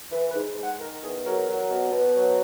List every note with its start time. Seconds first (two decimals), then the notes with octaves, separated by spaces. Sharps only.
0.11 E3 B4
0.29 B4
0.35 G#2
0.58 G#3 F#5
0.79 D#3 A#4
1.02 E2 G#4
1.25 F#3 A#4
1.48 F#3
1.70 B2
1.92 B2
2.15 F#3